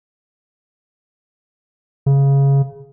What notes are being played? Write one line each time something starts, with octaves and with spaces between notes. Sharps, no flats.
C#3